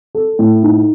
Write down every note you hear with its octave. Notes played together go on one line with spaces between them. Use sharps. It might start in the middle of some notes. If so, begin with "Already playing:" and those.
A4
A2
D#4